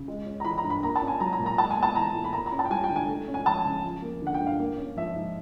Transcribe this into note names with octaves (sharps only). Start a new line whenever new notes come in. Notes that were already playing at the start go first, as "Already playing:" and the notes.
Already playing: C#3
G#3
C#4
A#5
E3 B5
A#5
G2
B5
A#3 A#5
A5
C#4
G#5
F#3 A#5
A#5
A#2
A#5
G#3 A5
G#5
B3
A5
E3 A#5
A2
B5
A#3 A#5
A#5
C#4
A5
G5
G3 G#5
G5
D3
G#5
A3
C#4
G#5
F3 A5
C#3
F3
A#3
D3 F#5
G5
G2
F5
A#3
C#4
F3 E5
G#2